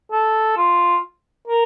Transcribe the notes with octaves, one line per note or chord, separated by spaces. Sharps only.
A4
F4
A#4